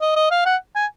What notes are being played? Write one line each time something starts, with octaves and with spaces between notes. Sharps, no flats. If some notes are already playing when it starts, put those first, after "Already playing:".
D#5
D#5
F5
F#5
G#5